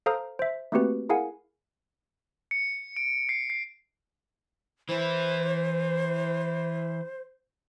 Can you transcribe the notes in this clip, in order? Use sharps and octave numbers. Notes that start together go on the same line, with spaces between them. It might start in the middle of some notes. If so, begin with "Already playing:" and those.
A4 C5 F5 A#5 D#6 F6
C5 E5
A3 A#3 C4 F#4 G4 B4
E4 G#4 A#4 F5 F#5 G#5
C#7
D7
C7
C7
E3 E4 C5